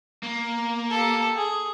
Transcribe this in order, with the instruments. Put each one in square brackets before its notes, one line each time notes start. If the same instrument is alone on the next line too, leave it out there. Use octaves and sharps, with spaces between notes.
[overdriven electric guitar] A#3
[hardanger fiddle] G4 A4
G#4